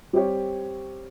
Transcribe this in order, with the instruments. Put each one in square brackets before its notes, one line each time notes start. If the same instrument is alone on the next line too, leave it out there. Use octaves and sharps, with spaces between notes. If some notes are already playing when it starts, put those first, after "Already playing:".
[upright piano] G3 C4 G4 C#5